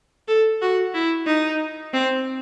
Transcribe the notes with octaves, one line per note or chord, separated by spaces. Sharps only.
A4
F#4
E4
D#4
C4